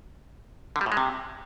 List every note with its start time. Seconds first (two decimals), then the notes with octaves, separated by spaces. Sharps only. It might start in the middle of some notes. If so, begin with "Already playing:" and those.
0.76 D3
0.81 G3
0.86 A2
0.92 G#3
0.97 C3